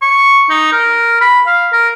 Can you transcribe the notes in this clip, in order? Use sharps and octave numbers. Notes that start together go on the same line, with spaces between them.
C#6
D#4
A#4
B5
F5
A#4